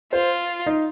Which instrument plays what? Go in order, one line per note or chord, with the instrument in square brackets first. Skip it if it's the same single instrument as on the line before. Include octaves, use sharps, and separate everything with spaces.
[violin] F4 [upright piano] C5
[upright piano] D#4